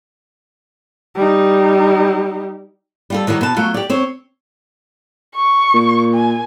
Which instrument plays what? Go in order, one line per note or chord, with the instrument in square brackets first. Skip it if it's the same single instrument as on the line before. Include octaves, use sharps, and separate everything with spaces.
[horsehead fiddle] G3 D#4
[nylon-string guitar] G3 F4 A4
D#3 E3 F#3 G3
B2 A5
F#3 A3 F4
G4 D5
C4 C5 C#5
[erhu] C#6
[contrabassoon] A#2
[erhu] G#5